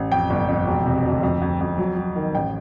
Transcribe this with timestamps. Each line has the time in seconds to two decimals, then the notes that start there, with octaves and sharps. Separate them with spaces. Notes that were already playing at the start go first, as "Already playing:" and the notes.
Already playing: A1
0.11 F2 G5
0.30 G1
0.48 F2
0.67 E1
0.86 C3
1.04 D2
1.23 F2
1.42 F2
1.61 F2
1.78 F#3
1.97 F#3
2.16 D#3
2.34 A1 G5